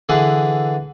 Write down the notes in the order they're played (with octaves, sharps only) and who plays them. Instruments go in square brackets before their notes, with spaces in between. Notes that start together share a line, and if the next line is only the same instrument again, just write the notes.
[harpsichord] D3 E3 G#4 B4